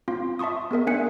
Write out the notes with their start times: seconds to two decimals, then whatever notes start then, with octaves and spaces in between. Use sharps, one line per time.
0.08 C4 F4 F5 C6
0.39 E5 A5 C6 C#6 D#6
0.71 B3 G#4 A#4 E5
0.87 A#3 D4 E5 G#5 F#6 C#7